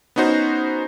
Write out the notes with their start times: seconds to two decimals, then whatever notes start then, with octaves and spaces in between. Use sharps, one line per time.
0.16 B3 C#4 D#4 F#4 C5